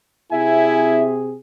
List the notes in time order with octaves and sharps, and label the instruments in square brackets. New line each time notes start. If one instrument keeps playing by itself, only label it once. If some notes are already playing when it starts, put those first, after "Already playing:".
[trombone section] C3 C4 G#4 [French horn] E4 [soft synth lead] E5 [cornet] G#5